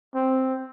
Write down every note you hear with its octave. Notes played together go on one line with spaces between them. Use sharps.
C4